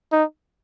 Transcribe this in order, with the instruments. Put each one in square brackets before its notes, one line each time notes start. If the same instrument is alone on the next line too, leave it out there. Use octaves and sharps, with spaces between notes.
[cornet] D#4